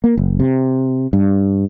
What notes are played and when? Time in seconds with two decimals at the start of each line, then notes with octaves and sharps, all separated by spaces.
0.04 A#3
0.17 F#1
0.40 C3
1.13 G2